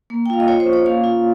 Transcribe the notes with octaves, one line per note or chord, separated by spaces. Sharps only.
A#3
G5
F4 F5
D#5
F4 C#5
C5
C#4
C#5
A#3 F5
F4